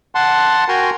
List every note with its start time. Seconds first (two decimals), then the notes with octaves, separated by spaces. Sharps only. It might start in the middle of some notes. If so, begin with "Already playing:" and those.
0.15 F#5 A5 C6
0.68 F#4 A#4 G5 G#5 A#5 C6